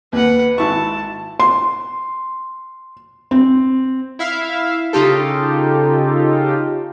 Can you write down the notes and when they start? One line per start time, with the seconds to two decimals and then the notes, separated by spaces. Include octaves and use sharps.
0.13 D#2 B4 F#5
0.58 G#1 E4 A5 C#6
1.40 C6
3.31 C4
4.19 E4 E5 F5
4.93 C#3 D#4 F4 G4 A4